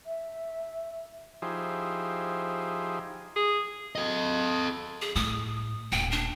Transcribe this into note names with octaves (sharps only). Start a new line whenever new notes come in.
E5
F3 D#4 E4 G4 G#4 C5
G#4
A4 D#5
G#4
A2 D#6
D#1 G5
D4